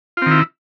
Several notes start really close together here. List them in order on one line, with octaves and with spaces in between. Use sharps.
F4 C4 D#3 E4